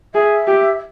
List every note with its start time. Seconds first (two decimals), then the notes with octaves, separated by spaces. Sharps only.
0.14 G#4 E5
0.47 G4